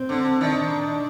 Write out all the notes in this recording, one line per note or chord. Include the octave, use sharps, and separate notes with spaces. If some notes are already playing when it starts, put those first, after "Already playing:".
Already playing: C4
D3
D#3 D4